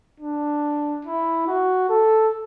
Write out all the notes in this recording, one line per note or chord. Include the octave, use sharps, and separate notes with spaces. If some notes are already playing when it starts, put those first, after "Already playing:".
D4
E4
F#4
A4